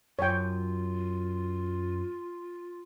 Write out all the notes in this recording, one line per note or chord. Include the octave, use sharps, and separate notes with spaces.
F#2 F4 C#5 G5